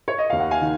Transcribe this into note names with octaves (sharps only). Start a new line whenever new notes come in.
C#5
D#5
D#2 F5
F#5
F5 G#5
D#3